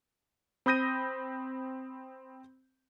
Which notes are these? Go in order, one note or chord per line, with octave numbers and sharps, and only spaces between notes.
C4 B5 D#6 G6 A#6 D#7